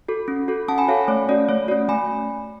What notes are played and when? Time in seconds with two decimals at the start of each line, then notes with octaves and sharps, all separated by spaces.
0.08 F#4 A4
0.28 C#4
0.48 F#4 A4
0.68 C#4 F#5 A5
0.78 G#5 B5
0.88 F#4 A4 C#5 F5
1.08 A3 C#5
1.29 C#4 F#4 D5
1.49 A3 C#5
1.68 C#4 F#4 D5
1.89 A3 G#5 B5